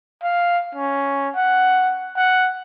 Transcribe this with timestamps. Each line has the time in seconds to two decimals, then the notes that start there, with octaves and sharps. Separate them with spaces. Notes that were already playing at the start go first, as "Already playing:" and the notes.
0.23 F5
0.75 C#4
1.36 F#5
2.17 F#5